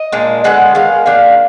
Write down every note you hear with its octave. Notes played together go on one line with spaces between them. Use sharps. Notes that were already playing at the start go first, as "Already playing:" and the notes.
Already playing: D#5
A#2 G#3 D4
D3 G#3 B3 F#5
D#3 G#3 F5
D#3 A#3 D4 F5